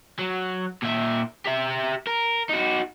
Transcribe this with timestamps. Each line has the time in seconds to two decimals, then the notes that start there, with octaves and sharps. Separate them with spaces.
0.19 F#3
0.83 A#2 E5
1.45 G4 E5
2.07 A#4
2.49 D#4 F#4